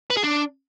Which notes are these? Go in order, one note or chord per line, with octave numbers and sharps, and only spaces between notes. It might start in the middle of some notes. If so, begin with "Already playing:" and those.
B4
G#4
D4